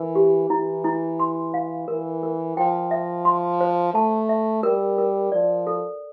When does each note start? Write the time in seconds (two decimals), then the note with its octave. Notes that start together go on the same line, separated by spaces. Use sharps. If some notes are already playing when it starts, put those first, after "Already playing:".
Already playing: E3 A#4
0.15 G4
0.50 E3 E4
0.84 E4
1.20 C6
1.54 F5
1.88 E3 A#4
2.23 A#4
2.57 F3 G5
2.91 E5
3.25 C6
3.61 C5
3.94 A3 A5
4.29 E5
4.63 G3 A#4
4.98 A#4
5.32 F3 D5
5.67 A4